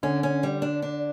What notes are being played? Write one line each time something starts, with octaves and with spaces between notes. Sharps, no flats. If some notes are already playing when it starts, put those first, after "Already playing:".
D3 C#4
C#4
G3
D4
D4